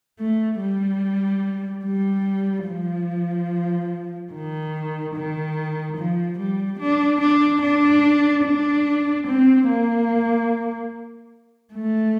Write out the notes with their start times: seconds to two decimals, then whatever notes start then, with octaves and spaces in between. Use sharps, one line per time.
0.20 A3
0.61 G3
1.85 G3
2.67 F3
4.33 D#3
5.15 D#3
5.97 F3
6.38 G3
6.80 D4
7.21 D4
7.62 D4
8.45 D4
9.27 C4
9.68 A#3
11.74 A3